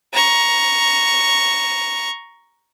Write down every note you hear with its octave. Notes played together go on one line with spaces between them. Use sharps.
A#5 C#6